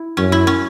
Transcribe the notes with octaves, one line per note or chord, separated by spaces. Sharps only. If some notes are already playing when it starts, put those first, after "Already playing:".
Already playing: E4
F#2 C#4
E4
C#4